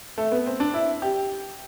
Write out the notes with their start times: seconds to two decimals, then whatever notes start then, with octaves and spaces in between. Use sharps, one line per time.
0.18 A3
0.32 B3
0.46 C4
0.60 D4
0.74 E4
1.02 G4